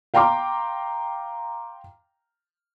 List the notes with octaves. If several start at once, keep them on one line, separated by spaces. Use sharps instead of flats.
F5 G5 A#5 C6 D6